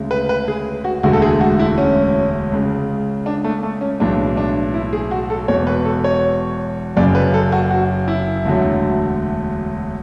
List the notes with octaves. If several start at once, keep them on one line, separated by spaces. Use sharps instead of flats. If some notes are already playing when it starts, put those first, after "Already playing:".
Already playing: D2 C#3 G#3
B4
B4
G#4
F#4
E1 D2 D3 G#3 F#4
A4
G#4
F#4
E4
C#4
C#2 C#3 G#3
D4
A3
A3
C#4
B1 A2 E3 G#3 D4
D4
E4
G#4
F#4
A4
E1 E2 B2 C#5
B4
A4
C#5
F#1 F#2 C#3 D5
B4
A4
F#4
F#4
E4
E1 D2 D3 F#3